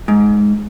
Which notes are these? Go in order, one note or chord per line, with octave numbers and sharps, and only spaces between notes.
G#2